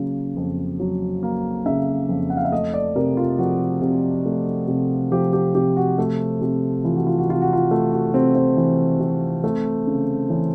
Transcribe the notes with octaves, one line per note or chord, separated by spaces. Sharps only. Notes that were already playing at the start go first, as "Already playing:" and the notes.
Already playing: C#3 F#3 A#3
F2
F#3
A#3
C#3 E5
F2
F#5
F5
E5
A3 D#5
D5
C3 A#4
F4
F3 F#4
C3
A3
C3
F3 G4
G4
C3 G4
F#4
A3
C3
E3 F4
F#4
F4
F#4
C3 F4
F#4
F4
A3
F#4
C3 C4
C4
E3
C3
A3
C#3
E3 C#4